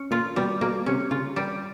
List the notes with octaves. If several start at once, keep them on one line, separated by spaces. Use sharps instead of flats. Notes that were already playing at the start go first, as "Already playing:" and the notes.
Already playing: C#4
A#2 F4
B2 G3
B2 A#3
C3 C#4
C#3 F4
G3